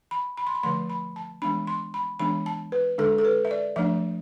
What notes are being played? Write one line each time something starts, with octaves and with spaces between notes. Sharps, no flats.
B5
B5
C6
B5
D3 F3 A3 C6
B5
A5
E3 G#3 B3 D4 B5
C6
B5
E3 G#3 B3 D4 B5
A5
B4
D3 G#3 D4 A4
A4
B4
E5
D5
F3 A3 D4 E5